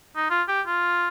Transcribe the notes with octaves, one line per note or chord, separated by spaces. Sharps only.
D#4
F4
G4
F4